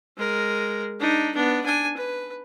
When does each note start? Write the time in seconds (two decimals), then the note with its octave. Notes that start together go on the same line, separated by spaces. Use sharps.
0.17 G#3 A#4
1.00 D4 D#4
1.34 B3 D4
1.65 D4 G#5
1.97 B4